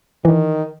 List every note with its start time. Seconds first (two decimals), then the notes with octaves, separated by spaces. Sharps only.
0.25 D#3 E3